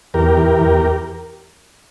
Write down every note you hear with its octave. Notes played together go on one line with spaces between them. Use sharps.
E2 G4 A#4
E3
E2